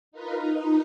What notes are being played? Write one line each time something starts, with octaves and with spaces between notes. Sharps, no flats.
D#4 F4 A#4 B4
D#4